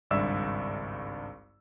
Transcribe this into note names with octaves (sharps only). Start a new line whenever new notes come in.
G#1 C#2 G2 D5 E5 E6